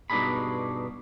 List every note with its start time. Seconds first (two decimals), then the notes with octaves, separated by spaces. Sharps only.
0.10 G2 B2 D4 D#4 G#4 B5